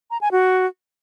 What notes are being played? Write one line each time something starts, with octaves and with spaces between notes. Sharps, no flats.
A#5
G#5
F#4